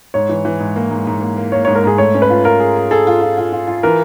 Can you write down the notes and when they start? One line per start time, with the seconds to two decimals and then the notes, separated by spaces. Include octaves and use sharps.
0.14 G#2 C#5
0.29 E3
0.45 E3
0.60 G#2
0.76 A#3
0.91 G#2
1.07 G#2
1.21 A#3
1.37 A#3
1.52 A#3 C#5
1.65 G#2 C#5
1.76 A#4
1.84 G#2 G#4
1.98 A3 C#5
2.14 C#4
2.22 B4
2.30 F4
2.44 F4 A#4
2.60 G#4
2.76 G#4
2.91 G#4 A4
3.07 F4
3.21 F4
3.38 F4
3.52 F4
3.68 F4
3.83 E3 A#4